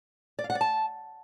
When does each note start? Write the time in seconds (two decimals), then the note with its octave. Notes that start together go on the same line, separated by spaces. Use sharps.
0.39 D5
0.44 F5
0.50 F#5
0.55 D5
0.61 A5